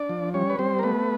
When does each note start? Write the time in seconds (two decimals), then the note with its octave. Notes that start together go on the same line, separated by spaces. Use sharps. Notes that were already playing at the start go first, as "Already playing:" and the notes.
Already playing: D4 D5
0.09 F3
0.34 G3 C#4 C#5
0.50 B4
0.59 G3 C4 C5
0.79 A#4
0.83 A3 B3 B4